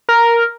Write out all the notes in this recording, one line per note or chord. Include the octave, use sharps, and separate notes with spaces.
A#4